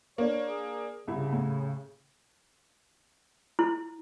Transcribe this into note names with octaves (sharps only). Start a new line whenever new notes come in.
A#3 D4 C#5
G#4
C2 C#3 E4
A2
E4